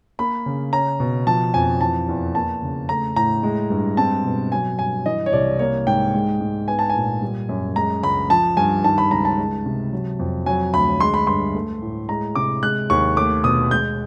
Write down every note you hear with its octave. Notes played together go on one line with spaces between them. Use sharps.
A#3 B5
C#3
C#4 A#5
B2
F3 A5
F2 G#5
E3 A5
E2
A#3 A5
C#3
A3 A#5
A2 A#5
G#3
G2
C4 A5
B2
F#3 G#5
G2 G#5
E3 D#5
C#5
C2 D5
A#3 C#5
G#2 G5
G#3
G#2
B3 G#5
A5
G#5
A#2
G3
F#2
G#3 A#5
C#2 B5
F3 A5
G2 G#5
D#3 A5
B5
C#2 A#5
A5
G#3
C3
F#3
F2
F#3 G#5
D2 B5
G#3 C6
B5
G2 C6
A3
A2
G#3 A#5
C3 D6
G#3 F#6
D#2 C#6
A3 D6
B2 D#6
G#3 G6